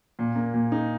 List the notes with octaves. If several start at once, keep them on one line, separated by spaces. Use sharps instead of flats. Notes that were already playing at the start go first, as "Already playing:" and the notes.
A#2
A#3
A#2
D#4